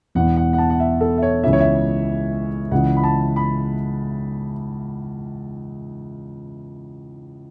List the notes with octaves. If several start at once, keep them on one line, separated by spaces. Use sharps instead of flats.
E1 E2 E3 F#5
F#5
F#5
A5
F#5
E5
A4
E5
C#5
C#2 C#3 E3 E5
C#5
E5
C#2 C#3 E3 F#5
B5
A5
B5